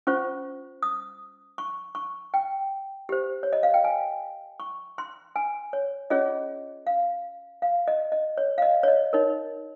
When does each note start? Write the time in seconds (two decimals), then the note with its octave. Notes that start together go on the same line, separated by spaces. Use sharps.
0.07 C#4 F4 C5 C#6
0.83 D#6
1.58 C#6
1.95 C#6
2.34 G5
3.09 G4 C5
3.43 C#5
3.53 D#5
3.63 F5
3.74 G5
3.84 G#5
4.60 C#6
4.98 C6
5.36 G#5
5.73 C#5
6.10 C#4 F4 G#4 C#5 D#5
6.87 F5
7.62 F5
7.88 D#5
8.12 D#5
8.37 C#5
8.58 F5
8.62 D#5
8.83 C#5
8.88 D#5
9.13 D#4 A#4 C#5